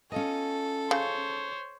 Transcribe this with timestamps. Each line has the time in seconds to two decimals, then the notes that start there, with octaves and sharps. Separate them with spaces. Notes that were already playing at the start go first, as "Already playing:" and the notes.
0.12 C#4 F4 A4 D#5
0.91 C#3 C5 C#5